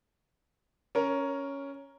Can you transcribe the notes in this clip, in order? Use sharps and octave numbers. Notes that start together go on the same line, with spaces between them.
C#4 A#4